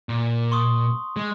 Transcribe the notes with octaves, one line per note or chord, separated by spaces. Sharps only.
A#2
C6 C#6 D#6
G#3